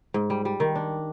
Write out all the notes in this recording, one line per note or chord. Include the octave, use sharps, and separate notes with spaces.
G#2
G3
G3
D#3
D4